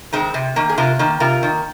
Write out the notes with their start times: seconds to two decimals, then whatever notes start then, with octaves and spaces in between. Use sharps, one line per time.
0.13 D#3 G#3 C4
0.34 C3
0.56 D#3 A#3
0.69 G#4
0.78 C3 F4 A#4
0.99 D#3 A#3
1.20 C3 F4 A#4
1.43 D#3 A#3